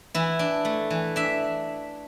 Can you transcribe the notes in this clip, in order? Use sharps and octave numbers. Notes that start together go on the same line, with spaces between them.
E3 E4
D4
A3
E3
D4 E5